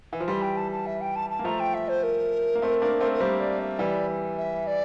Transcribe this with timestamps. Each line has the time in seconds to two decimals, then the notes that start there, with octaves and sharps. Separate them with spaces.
0.13 E3
0.20 F3
0.28 E3 G3 C6
0.42 G5
0.57 A5
0.72 A5
0.86 E5
1.01 G5
1.16 A5
1.30 A5
1.39 A#3
1.44 F3 A3 A#5
1.60 G5
1.74 E5
1.89 C5
2.03 A#4
2.55 A#3
2.62 A3 C4
2.82 A#3 D4
3.00 A3 C4
3.14 A#4
3.20 G3 A#3 C5
3.40 D5
3.60 E5
3.79 E3 G3 D5
4.37 E5
4.67 D5